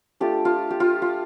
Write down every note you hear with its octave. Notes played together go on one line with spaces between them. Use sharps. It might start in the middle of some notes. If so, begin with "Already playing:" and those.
A3 D4 F4 G4
F4
G4
F4
F4